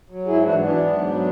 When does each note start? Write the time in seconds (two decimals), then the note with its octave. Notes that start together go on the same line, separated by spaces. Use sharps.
0.10 F#3
0.26 G#2 E4 G#4
0.42 E3 D4 F#4
0.59 E3 B3 D4
0.75 G#2
0.92 F#3
1.09 F#3